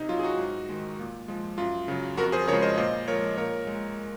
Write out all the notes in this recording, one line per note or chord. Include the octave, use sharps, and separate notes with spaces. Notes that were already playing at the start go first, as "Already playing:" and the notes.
Already playing: C3 D#4
F#3 F4
G#4
D#4 F#4
G#2
D#3 G#3
A#2
F3 G#3
F#2 F4
C#3 F#3
F2 F#4 A#4
G#4 C5
C#3 F3 G#3 A#4 C#5
C5 D#5
A#2 C5 D#5
F3 G#3 A#4 C#5
A#2 A#4 C#5
G#3